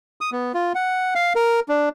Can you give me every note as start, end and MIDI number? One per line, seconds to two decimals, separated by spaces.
0.21 0.30 87
0.32 0.52 59
0.54 0.73 65
0.75 1.14 78
1.15 1.33 77
1.35 1.60 70
1.69 1.89 62